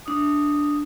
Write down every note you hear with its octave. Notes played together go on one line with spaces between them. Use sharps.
D4 D#6